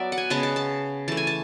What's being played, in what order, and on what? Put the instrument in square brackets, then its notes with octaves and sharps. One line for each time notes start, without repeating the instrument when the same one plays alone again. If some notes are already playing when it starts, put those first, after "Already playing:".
Already playing: [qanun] F#3 B3 D5 E5
F#5
G#5
C#3 G#3 B3 A5
A5
A5
E3 A3 A5
G#5
A5